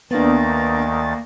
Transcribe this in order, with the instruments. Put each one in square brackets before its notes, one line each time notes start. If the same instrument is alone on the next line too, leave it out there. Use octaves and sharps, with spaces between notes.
[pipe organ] D2 D#3 A6 [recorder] A#3 [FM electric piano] B3 D4